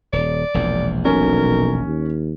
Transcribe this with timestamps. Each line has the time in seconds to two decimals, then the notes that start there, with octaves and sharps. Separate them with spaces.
0.13 D#1 D5
0.54 E1 A#1 E2
1.05 B1 C#4 A#4
1.85 D#2